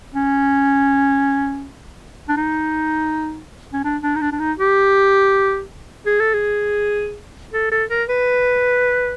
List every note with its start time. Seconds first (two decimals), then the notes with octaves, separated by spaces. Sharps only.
0.15 C#4
2.29 D4
2.37 D#4
3.73 C#4
3.84 D4
4.03 D4
4.15 D#4
4.21 D4
4.32 D4
4.40 D#4
4.58 G4
6.06 G#4
6.20 A4
6.33 G#4
7.53 A4
7.72 A4
7.90 A#4
8.09 B4